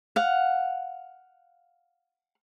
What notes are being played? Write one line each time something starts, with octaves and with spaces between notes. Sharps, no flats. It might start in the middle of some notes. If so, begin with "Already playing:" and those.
F5 F#5